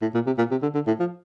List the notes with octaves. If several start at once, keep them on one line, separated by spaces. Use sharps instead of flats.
A2
A#2
C3
A#2
C3
D3
D3
A2
F3